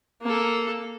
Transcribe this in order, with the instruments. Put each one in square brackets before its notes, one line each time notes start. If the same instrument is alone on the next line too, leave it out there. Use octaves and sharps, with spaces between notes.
[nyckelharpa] A#3 A4